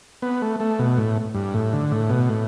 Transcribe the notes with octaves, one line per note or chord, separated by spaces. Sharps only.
B3
A3
A3
B2
A2
G2
A2
D3
A2
B2
A2